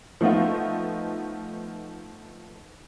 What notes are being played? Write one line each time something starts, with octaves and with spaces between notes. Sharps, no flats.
F3 A3 B3 D#4 F4